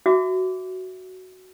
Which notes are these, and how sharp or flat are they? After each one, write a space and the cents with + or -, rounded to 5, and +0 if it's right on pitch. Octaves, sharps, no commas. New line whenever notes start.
F#4 +5 E5 +0 D6 -15